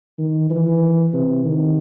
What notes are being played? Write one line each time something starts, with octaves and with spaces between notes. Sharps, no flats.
D#3
E3
C3
D#3